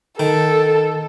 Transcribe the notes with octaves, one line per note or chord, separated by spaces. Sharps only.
D#3 A4